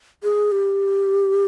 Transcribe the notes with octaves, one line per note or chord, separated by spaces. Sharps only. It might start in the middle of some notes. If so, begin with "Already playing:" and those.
G#4
G4